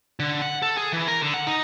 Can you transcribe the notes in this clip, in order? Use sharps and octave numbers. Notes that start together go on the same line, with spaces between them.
D3
F#5
A4
G#4
E3
A#4
D3
F#5
D#4